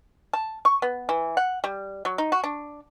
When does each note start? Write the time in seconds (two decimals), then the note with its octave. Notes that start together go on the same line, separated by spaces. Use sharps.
0.33 A5
0.65 C#6
0.82 B3
1.09 E3
1.37 F#5
1.64 G3
2.05 F#3
2.18 D#4
2.32 F#4
2.44 D4